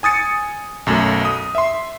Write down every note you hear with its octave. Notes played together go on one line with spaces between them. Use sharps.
G#5 D#6 A6 C#7
B1 F#2 A3
D#6
E5 C6